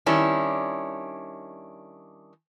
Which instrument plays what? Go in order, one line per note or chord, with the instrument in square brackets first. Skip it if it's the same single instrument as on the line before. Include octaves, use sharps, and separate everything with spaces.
[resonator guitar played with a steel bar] D#3 G3 C#4 D4 E4